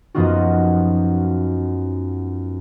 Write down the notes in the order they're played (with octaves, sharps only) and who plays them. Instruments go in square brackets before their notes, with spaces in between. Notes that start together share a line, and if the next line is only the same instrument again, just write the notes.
[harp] F#2 F3 B3 D#4 F4 F#4